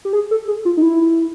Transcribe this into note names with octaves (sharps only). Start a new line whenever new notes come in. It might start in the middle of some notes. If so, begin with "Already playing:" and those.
G4
G#4
A4
G#4
F4
D#4
E4